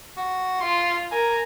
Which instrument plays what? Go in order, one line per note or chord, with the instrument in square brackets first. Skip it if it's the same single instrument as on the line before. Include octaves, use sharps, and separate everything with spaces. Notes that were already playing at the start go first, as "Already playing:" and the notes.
[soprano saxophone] F#4
[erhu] F4 [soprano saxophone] C6
[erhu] A#4 [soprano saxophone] G#5